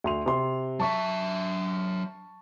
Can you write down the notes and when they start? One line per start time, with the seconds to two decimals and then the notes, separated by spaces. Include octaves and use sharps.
0.04 D2 C6 F7
0.26 C3 C6
0.80 F#3 E5 A5 C#6